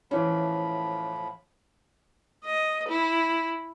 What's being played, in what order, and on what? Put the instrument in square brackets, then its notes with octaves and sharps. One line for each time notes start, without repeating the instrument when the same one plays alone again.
[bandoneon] A2 F3 B5 [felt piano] E3 C#4
[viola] D#5
E4